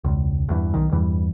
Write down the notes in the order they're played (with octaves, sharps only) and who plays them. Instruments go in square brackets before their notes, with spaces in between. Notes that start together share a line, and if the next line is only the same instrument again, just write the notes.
[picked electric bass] E1 C#2
E2 G2 E3
B1 D#3
E2 G2 E3 G3